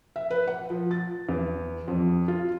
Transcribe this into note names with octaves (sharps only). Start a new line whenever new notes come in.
E5
B4
F#5
F3
A6
E2
F2
F4